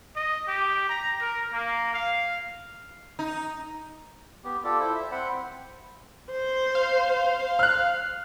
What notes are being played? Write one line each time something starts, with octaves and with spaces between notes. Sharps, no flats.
D#5
G4
A#5
A#4
A#3
F5
D#4
B3 G4
F4 G4 A4 D5
E4 A4 C5
E5
C4 C5 F#5 B5
C5
F5
F6 F#6